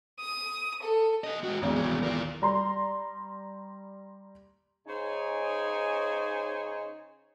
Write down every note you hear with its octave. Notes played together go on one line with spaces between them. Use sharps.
D#6
A4
G4 D#5
G#3 F#4
G#1 E2 G#2
C2 F#3
A#4 D5
G3 A#5 C6
C#3 D#4 C5 C#5 G#5